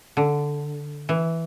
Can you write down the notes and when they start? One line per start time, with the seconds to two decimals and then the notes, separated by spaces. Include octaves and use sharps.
0.17 D3
1.09 E3